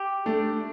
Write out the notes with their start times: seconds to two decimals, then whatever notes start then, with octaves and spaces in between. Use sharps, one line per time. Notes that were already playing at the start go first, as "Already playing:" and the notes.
Already playing: G4
0.26 A3 D4